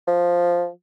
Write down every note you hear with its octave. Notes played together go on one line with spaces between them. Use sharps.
F3